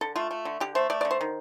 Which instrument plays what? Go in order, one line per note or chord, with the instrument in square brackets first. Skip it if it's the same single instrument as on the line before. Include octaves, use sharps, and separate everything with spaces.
[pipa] D3 A4
A3 F4
A3
D3
D3 G4
A3 C5
A3 D5
D5
D3
C5
D#3